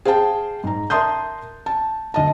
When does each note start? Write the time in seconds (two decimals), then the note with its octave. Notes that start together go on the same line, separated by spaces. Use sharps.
0.05 G#4 C5 F5 G5 A5
0.64 G#2 A#5
0.90 A#4 E5 A5 C6 D#6 G6
1.66 A5
2.14 D2 D#5 A5